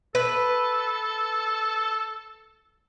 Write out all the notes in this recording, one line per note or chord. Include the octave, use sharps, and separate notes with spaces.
A4 B4